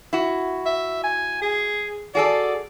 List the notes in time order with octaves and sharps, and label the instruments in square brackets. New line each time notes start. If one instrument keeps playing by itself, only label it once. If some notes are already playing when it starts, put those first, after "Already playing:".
[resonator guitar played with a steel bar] E4 F#4
[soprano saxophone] E5
G#5
G#4
[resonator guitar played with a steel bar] F#4 G#4 A4 [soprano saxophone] D5